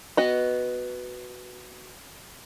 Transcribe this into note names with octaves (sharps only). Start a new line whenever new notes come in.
B3 F#4 D#5